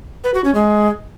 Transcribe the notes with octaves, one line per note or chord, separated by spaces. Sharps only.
B4
F#4
C#4
G#3